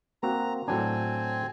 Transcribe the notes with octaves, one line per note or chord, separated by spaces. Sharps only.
A#3 C4 F#4 A#5
A2 F#3 C4 D4 G#5